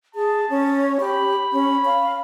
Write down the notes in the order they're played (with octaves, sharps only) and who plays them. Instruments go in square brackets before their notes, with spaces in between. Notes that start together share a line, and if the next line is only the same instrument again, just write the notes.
[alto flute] G#4 [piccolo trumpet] A5
[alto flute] C#4
[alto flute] G4 [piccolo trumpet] B5
[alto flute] C#4
F5